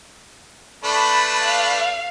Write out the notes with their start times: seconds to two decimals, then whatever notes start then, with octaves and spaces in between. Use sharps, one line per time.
0.84 A3 D4 B4 B5
1.43 F5